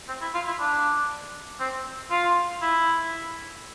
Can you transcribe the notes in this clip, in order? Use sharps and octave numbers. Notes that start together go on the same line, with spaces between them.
C4
E4
F4
E4
D4
C4
F4
E4